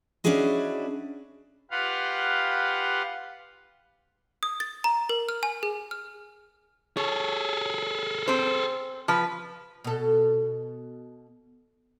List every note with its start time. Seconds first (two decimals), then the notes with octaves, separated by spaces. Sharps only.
0.24 C#4 D4 E4 F#4 G#4 D#5
1.71 F4 G4 B4 F5 F#5
4.43 D#6
4.60 A6
4.84 A#5
5.09 A#4
5.29 F6
5.43 G#5
5.63 G#4
5.91 F6
6.97 G#4 A4 C#5
8.28 C4 C5
9.08 F3 B4
9.84 B2 A4